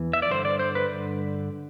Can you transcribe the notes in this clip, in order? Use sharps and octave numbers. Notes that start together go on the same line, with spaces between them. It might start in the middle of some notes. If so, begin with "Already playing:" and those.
Already playing: E2 E3
E5
D5
G2 D3 C5
D5
C5
B4